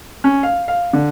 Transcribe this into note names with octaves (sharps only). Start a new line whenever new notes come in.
C#4
F5
F5
D3